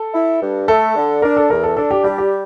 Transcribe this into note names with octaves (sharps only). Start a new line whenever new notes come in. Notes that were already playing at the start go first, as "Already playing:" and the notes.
Already playing: A4
E4
G2
A3 A4
D3
D4 A#4
A4
E2 A#4
A4
D4 A4
G4
G3 G4
G4